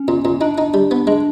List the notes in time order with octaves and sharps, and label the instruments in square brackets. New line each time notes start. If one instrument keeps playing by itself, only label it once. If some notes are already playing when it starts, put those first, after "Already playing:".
Already playing: [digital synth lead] C#4
[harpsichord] A#2
A#2
[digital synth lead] D4 [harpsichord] D#4
[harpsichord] D#4
G3
B3
[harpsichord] G#3 [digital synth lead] D4